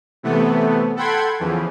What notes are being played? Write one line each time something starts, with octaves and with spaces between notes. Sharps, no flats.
C3 E3 A3 B3
A4 F#5 G5 B5 C6 G#6
E2 C#3 E3 F3